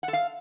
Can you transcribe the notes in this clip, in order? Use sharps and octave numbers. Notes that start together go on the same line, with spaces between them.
F#5
A4
F5